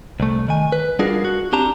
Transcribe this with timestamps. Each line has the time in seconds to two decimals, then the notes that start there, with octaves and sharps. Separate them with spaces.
0.20 C2 A3
0.48 D#3 G#5
0.72 B4
0.99 G3 D4 F4 F#4 G#4 A#4
1.25 F#4
1.53 C4 D4 G4 A5 A#5